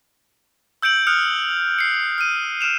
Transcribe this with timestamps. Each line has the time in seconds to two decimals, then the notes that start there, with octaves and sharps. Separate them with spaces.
0.82 E6 G6 C#7 D7 F#7
1.07 D#6 F6 F#6 C#7 F7
1.79 C7 C#7
2.18 F6 D#7
2.61 F6 D7 E7 F7